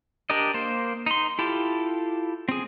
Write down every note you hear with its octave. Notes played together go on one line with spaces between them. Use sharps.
D4 G4 A#4 D5 D#5
A#3 C5
D#4 C6
E4 F4 G4 A4
C4 G#4